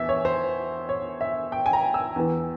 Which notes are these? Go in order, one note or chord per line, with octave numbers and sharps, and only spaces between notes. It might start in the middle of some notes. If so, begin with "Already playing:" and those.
Already playing: E2 E3 E5
C#5
C5
C#5
E5
G5
G#5
A#5
E6
E2 E3